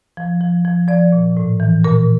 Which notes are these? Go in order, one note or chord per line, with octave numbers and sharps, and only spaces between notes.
F3
F3
F3
F3 D5
A#2
A2
E3
A#2 A#4